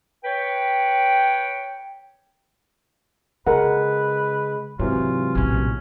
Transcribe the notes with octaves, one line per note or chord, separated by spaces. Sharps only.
B4 C#5 G5
C#3 G#3 A#4 B4 F#5
G#2 C3 E3 F#3 F4
A#1 A2 C#4